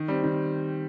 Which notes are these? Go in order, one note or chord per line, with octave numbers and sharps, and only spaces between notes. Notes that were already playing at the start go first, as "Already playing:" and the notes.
Already playing: D#3
G3 C4
D#3